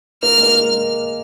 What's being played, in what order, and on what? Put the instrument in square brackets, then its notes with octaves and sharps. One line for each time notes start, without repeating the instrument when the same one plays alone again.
[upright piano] A#3 [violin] F6
[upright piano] G#3
A#3